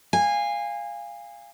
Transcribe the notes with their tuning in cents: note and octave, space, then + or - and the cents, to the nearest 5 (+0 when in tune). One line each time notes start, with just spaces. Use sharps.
F5 +0 G#5 -25